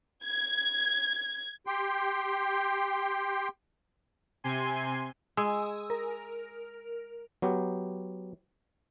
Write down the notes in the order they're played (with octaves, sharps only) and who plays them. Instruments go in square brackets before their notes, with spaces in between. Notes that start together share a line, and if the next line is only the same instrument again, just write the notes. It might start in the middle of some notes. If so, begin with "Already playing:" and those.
[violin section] G#6
[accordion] G4 G5 C6
[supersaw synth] C3 G#5 C6
[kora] G#3 [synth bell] G#5 D#6 E6
[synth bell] A#4
[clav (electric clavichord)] F#3 B3 G4